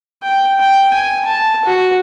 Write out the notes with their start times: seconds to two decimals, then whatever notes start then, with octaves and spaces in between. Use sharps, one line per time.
0.23 G5
0.60 G5
0.94 G#5
1.25 A5
1.65 F#4